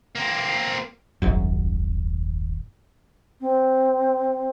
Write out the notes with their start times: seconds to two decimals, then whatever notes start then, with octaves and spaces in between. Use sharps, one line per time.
0.15 A#3 C4
1.22 D#1 G#1 F#2
3.41 C4